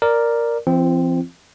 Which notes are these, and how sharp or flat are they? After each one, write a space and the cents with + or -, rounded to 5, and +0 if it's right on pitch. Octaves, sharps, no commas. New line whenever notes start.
A#4 +0 D5 +0
E3 +45 C4 +0 F4 -40